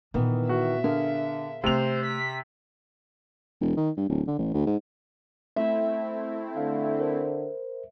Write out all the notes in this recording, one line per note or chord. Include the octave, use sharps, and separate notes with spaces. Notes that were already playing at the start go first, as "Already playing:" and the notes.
A#2 D#3 E3 B3 D4
F#4 E5
D3 G#4 A#4 F5
C3 A3 C4 C5 F7
B6
E1
D#3
G2
D1
D3
A1
D2
G#2
A3 C4 E4 E5
D3 F5
A#4 C5